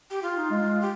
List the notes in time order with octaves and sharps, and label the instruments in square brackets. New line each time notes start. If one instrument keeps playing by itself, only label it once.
[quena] G4
F4
[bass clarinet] D#4
G#3
[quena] G4